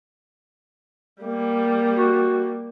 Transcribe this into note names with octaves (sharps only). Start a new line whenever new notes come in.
G3 A#3
F#4